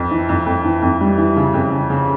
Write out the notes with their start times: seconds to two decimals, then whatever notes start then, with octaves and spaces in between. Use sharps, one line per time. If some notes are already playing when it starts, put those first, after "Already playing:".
Already playing: F2
0.11 E3
0.29 F2
0.46 F2
0.64 E3
0.82 F2
1.01 G3
1.18 E3
1.36 C#3
1.54 F2
1.72 C#3
1.90 C#3